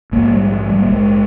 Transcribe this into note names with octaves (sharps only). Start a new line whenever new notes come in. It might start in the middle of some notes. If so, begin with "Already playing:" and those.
A#1 G#2 A#3
G3
G3
A#3
A#1 G#2 G#3